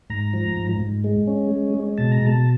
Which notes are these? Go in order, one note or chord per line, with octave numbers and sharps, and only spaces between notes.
G#2 A#5
F3
G#2
G#2
G#3
C#4
G#3
G#3
B2 A5
A#5
B2 A5